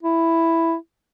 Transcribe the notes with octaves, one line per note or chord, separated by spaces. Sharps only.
E4